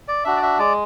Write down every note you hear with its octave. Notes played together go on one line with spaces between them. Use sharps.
D5
D4 F#4 E5
D5
E5
G#3 D5